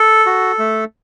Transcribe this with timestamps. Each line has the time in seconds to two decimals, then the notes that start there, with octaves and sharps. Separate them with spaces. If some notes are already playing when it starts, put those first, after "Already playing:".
Already playing: A4
0.26 F#4
0.59 A3